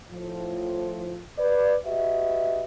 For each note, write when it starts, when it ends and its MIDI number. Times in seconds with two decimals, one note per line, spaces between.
0.12 1.22 45
0.12 1.22 53
1.38 1.75 71
1.38 1.75 74
1.86 2.65 66
1.86 2.65 67
1.86 2.65 71
1.86 2.65 75
1.86 2.65 76